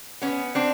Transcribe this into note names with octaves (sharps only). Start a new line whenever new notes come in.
B3 C#4
C4 D4